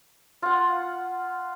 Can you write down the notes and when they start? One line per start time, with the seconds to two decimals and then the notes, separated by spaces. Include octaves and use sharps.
0.42 F4 F#5